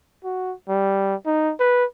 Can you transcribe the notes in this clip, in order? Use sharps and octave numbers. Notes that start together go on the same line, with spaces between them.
F#4
G3
D#4
B4